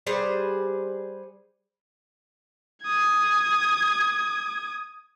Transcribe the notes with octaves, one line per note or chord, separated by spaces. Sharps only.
G3 G#4 B4 C5
D#6 G#6